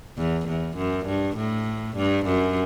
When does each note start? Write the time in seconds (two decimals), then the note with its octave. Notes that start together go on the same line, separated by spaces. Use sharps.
0.18 E2
0.48 E2
0.77 F#2
1.07 G2
1.37 A2
1.97 G2
2.27 F#2